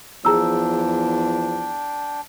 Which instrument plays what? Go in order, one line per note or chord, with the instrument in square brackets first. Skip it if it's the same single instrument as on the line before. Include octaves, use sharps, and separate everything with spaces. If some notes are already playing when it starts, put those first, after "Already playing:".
[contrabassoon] E2 [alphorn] F3 [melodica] D4 G5 [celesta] G#4 A#5 E6